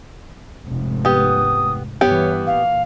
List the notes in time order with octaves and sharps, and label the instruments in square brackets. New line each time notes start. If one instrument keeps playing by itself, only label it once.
[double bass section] F1 C#2 G#2
[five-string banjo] B3 G4 [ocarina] D#6
[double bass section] G2 E3 [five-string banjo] B3 G4 [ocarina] C#5
[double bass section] A#2 [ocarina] F5